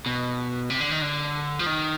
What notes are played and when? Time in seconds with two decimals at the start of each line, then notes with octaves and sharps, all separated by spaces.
0.06 B2
0.70 C3
0.80 D3
0.91 D#3
1.02 D3
1.59 F3
1.66 D#3